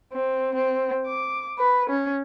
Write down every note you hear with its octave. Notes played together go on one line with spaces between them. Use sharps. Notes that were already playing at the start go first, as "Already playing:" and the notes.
C4
C4
D6
B4
C#4